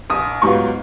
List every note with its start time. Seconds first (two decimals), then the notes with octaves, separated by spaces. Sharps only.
0.10 A#1 D#6
0.42 G#2 F#3 B3 F4 C#6